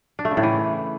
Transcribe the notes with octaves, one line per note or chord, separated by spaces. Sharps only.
D4
A3
C#3
A2
E3